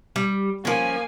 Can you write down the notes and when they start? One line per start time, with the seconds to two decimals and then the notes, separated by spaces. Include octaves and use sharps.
0.16 G3
0.65 F3 A#3 C#4 G#5